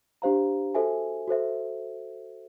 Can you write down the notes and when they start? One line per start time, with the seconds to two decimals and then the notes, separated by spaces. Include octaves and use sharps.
0.22 D4 G4 C5 F5 A#5
0.75 F#4 A4 C5 E5 G#5
1.27 F#4 A4 C5 E5